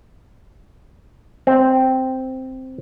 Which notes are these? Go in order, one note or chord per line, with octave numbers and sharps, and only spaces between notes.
C4